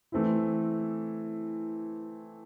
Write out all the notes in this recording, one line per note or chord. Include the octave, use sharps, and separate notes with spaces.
E3 A3 C4 E4